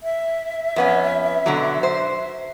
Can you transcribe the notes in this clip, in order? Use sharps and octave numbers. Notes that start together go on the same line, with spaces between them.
E5
F2 B3 C#4
B2 D3 F#3
C5